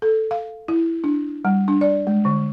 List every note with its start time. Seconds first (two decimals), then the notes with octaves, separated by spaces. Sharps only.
0.02 A4
0.31 F5
0.68 E4
1.04 D4
1.45 G3
1.68 D4
1.81 D5
2.07 G#3
2.25 D3